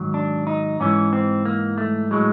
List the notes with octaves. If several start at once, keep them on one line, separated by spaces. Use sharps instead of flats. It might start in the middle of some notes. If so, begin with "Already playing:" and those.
Already playing: G#2 D#3 F#3
D4
D#4
G#2 E3 C#4
C4
A#3
A3
A2 F#3 G#3